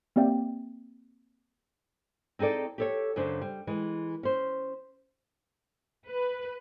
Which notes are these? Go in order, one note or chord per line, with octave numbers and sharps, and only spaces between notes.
A#3 C4 G4 D5 E5 G5
C4 D#4 G#4 A4 D5
G4 A4 C#5
F#2 C#3 D4 C5
G3
E3 G#3
C#4 C5
B4